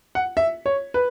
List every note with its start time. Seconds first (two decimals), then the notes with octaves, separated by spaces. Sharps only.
0.15 F#5
0.37 E5
0.66 C#5
0.94 B4